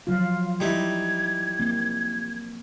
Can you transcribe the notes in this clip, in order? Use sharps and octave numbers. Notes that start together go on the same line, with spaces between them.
F3 F#3 F4 F5
E3 G3 D#4 E4 G#6
A#3 C4